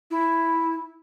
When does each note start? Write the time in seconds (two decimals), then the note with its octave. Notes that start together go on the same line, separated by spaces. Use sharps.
0.10 E4